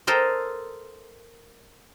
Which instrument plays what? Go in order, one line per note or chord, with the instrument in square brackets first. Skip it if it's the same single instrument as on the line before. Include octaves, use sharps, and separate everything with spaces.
[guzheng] A4 A#4 C5 D#5